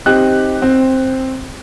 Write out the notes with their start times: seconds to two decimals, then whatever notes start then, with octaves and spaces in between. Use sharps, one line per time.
0.06 C4 D#4 G4 F#6
0.62 C4